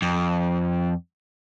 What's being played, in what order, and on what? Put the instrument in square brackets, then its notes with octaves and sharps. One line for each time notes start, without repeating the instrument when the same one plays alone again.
[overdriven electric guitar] F2